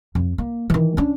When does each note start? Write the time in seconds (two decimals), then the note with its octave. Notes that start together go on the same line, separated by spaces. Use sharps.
0.15 F2
0.38 A#3
0.70 D#3 E3
0.97 C#4 D4